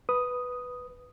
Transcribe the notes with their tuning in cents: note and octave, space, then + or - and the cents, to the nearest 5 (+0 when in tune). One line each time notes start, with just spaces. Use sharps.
B4 +0 D#6 +0